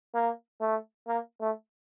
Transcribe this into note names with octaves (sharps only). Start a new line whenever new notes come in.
A#3
A3
A#3
A3